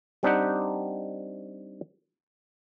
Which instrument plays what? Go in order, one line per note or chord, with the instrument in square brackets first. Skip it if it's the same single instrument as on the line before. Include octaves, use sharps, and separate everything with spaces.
[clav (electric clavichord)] G3 C4 D4 D#4 G4 F#5